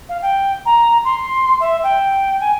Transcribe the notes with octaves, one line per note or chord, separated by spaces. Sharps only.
F5
G5
A#5
C6
E5
G5
G#5